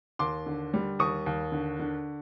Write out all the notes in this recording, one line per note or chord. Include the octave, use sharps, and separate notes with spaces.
D#2 C6 D6
D3
G3
D#2 C#6 D#6
D#2
D3
D3